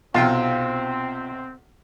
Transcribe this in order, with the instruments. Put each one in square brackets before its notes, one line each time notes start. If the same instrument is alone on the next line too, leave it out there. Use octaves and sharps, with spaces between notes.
[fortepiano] B1 C3 G5 [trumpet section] C4 [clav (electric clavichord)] F4